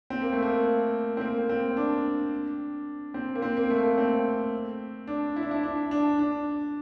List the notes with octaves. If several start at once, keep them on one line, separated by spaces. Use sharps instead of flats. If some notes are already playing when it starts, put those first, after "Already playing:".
C4
A#3
A3
A#3
C4
A#3
C4
D4
C4
A#3
C4
A#3
A3
A#3
C4
D4
E4
D4
E4
D4
D4
D4